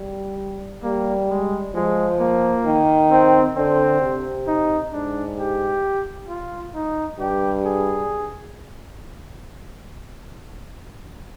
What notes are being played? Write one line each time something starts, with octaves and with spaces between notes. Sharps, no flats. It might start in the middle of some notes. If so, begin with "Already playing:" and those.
Already playing: G3
G3 A#3
G#3
F3 G#3
A#3
D#3
C4
D3 C4
C3
D#4
G#2 D4
G4
F4
D#4
G2 G4
G#4